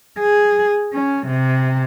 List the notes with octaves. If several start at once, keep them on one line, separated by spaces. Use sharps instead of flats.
G#4
C#4
C3